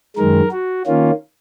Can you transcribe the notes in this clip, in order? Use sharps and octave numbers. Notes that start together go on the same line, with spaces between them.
F#2 D#3 G#3 A#4
F#4
D#3 A#3 C#4 F4